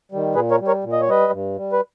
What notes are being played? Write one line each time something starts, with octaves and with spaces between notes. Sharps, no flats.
D#3 G3
A#2 G#4 B4
A#4 C#5
G3
A#4 C#5
A#2
D#5
C#5
G3 B4 D#5
G2
G3
B4